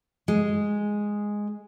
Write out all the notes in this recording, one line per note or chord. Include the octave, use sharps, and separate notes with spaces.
G#3